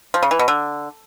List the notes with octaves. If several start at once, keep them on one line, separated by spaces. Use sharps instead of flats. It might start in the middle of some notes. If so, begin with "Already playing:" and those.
F3
C#3
E3
B2
D3